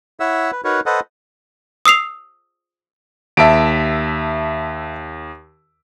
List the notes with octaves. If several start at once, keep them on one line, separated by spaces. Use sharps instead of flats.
E4 C#5 E5 F#5 E6
B4
D#4 F#4 A#4 B4 C#5
A4 B4 C5 D#5 F#5
D#6 E6 C7 F7
D#2 E5 A5 D7